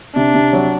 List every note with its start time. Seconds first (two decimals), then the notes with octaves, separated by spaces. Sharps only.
0.15 C3 D4
0.35 C3
0.53 F#3